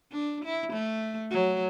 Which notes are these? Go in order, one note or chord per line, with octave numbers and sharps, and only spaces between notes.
D4
E4
A3
F#3